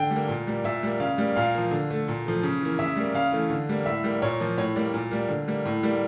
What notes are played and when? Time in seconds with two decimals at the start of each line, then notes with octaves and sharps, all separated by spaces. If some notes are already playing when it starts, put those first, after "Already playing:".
Already playing: D3 G5
0.11 G3
0.16 A#3
0.28 A#2
0.47 G3 A#3
0.64 A#2 E5
0.83 G3 A#3
1.00 C#3 F5
1.18 G3 A#3
1.36 A#2 F5
1.54 F3 A#3
1.71 D3
1.90 A3
2.08 A#2
2.26 F3 A3
2.43 C#3
2.61 E3 A#3
2.79 C#3 E5
2.96 G3 A#3
3.14 C#3 F5
3.32 E3 A3
3.50 D3
3.69 G3 A#3
3.86 A2 E5
4.04 G3 A#3
4.22 A#2 C#5
4.40 F3 A#3
4.58 A2 C#5
4.76 G3 A#3 D5
4.94 A#2
5.11 G3 A#3
5.29 D3
5.48 G3 A#3
5.65 A2
5.83 G3 A#3